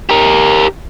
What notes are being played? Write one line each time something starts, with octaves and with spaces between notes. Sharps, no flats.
G4 A#4